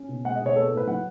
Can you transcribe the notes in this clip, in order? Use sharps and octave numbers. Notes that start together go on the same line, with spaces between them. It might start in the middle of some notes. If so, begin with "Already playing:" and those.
Already playing: C#4
B2
G#3 F#5
D#5
B2 C#5
B3 A4
A4
A2 B4
F#3 F#5